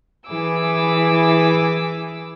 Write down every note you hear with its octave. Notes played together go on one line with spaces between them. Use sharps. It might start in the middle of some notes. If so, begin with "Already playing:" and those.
E3 E4 G#4 D6 E6